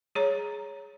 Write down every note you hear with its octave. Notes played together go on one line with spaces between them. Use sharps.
G#4 C#5 A#5